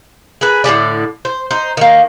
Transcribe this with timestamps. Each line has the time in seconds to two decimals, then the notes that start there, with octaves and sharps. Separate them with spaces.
0.41 G#4 A#4 B4
0.64 A2 D3 G3 D5
1.25 C5
1.51 D#4 C5
1.77 D#3 A#3